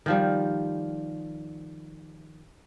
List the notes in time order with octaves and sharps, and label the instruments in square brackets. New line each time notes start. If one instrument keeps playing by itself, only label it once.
[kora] D#3 F3 G3